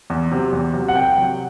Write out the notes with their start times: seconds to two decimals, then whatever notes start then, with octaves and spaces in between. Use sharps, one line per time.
0.10 E2
0.32 C3 F#3
0.52 E2
0.74 C3 F#3
0.88 F#5
0.94 C2 G5
1.17 C3 F#3